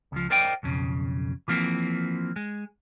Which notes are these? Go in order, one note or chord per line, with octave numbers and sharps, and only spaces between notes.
C#2 F3
A#4 C5 D5 D#5 G5
B1 F2 C#3
E3 F3 A#3 C4
G#3